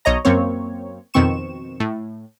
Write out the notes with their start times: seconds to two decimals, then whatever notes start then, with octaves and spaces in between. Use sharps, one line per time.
0.05 B1 C#5 D#5 A#5
0.25 F#2 A#3 C4 C#5
1.14 F2 B2 D#3 C4 C#6 E7
1.80 A2